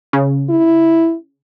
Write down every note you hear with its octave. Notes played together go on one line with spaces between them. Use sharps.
C#3
E4